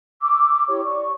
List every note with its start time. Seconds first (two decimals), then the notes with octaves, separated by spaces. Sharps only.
0.22 C#6 D6 E6
0.69 E4 G4 C#5 C#6
0.85 D5 C#6